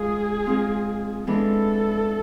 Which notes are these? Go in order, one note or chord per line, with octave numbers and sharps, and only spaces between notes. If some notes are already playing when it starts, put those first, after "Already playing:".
Already playing: G#3 F4 G#4
G#3 C4 F4
E3 G#3 B3 D4 A4